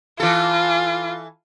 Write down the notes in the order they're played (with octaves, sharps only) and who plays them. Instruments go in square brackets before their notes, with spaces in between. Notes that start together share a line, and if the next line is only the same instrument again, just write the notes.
[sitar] E3 A4 [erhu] F4